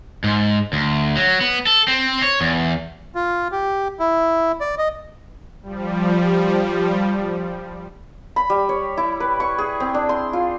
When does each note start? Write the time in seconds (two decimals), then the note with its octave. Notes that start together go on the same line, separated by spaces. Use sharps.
0.24 G#2
0.73 D2
1.17 F#3
1.41 B3
1.67 A4
1.88 C4
2.22 C#5
2.41 E2
3.15 F4
3.52 G4
3.99 E4
4.61 D5
4.78 D#5
5.63 F3 G3
8.36 B5
8.50 G3
8.69 C#5
8.97 E4
9.20 B4
9.40 C#6
9.58 G#4
9.80 C4
9.94 D4
10.09 C6
10.33 F4